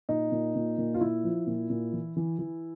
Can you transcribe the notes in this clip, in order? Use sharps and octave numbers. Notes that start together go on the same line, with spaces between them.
A#2 D#4
A#2
A#2
A#2
F4
A#2 E4
F3
A#2
A#2
E3
E3
E3